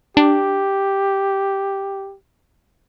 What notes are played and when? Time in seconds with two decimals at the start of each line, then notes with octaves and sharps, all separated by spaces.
0.17 D4 G4